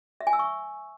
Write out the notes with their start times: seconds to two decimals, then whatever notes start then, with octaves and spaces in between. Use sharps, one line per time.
0.21 E5
0.27 G#5
0.33 E6
0.39 C#6